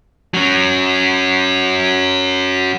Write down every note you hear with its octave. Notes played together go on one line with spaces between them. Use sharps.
F#3 C#4